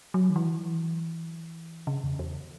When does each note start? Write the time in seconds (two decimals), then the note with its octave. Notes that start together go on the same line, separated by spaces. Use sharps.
0.14 F#3
0.30 D#3
0.36 E3
1.87 C#3
2.04 E2
2.19 E2